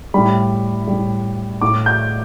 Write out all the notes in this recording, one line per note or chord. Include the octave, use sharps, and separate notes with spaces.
A2 G3 B5
A2 G3
A2 A3 D6
G6